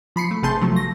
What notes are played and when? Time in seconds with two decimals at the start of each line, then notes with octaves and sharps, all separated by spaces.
0.16 F3 B5 C7 C#7
0.31 A3
0.43 G1 C3 G#4 A5 C6 G6
0.61 F3 F#3 A3
0.76 A#6